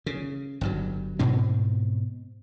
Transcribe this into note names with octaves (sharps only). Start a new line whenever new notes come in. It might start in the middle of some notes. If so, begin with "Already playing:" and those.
C#3
G1 G2 F#3
G#2 B2 C4